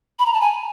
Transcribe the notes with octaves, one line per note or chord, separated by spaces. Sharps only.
B5
A#5
A5
G#5